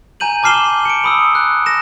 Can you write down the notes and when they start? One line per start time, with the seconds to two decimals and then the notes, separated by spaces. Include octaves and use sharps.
0.20 G#5 A#5 G6 D#7 F#7
0.43 A5 D6 F6 C7 E7 G7
0.85 C#7 D7
1.04 B5 D#6 E6
1.35 F#6
1.66 A#6 E7